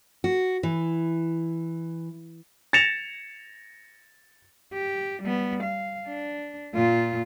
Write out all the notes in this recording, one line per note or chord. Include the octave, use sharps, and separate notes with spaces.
F#4
E3
A6 A#6 C#7 E7 F7
G4
G3 B3
F5
D4
A#2 F4